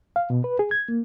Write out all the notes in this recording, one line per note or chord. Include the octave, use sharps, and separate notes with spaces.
F5
B2
B4
G#4
G#6
A#3